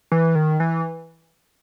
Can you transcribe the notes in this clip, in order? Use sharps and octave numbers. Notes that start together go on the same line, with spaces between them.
E3
D#3
E3